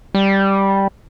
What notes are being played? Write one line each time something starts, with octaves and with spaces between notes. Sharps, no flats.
G3